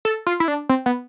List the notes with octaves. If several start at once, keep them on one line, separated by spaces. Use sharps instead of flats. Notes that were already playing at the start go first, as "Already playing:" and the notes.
A4
F4
E4
D4
C4
B3